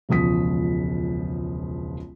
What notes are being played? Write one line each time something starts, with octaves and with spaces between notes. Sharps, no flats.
E1 C#2 F3 D#6 B6